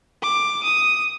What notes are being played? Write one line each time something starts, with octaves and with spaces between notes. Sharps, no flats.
D6
D#6